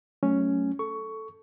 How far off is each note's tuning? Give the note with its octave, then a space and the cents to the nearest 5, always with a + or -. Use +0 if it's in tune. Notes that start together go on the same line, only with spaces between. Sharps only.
F#3 +15 A3 +0 C#4 +0
A4 +0 C#6 +10